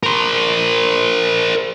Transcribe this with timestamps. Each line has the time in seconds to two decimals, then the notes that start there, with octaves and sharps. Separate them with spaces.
0.03 A#4 C5